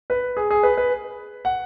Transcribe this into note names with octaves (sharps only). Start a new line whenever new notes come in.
B4
G#4
G#4
B4
B4
F#5